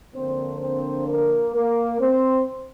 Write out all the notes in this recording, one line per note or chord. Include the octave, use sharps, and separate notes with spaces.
D3 F3 A#3 C4 D4 C5
C4 C5
A#3 A#4
A#3 A#4
C4 C5